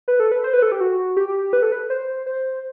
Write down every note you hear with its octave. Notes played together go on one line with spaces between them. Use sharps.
B4
A4
B4
C5
B4
A4
G4
F#4
G4
B4
A4
B4
C5
C5